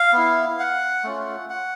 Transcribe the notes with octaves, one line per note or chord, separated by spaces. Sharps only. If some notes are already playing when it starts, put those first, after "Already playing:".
Already playing: F5
B3 E4
F#5
A3 C#4 F4
F#5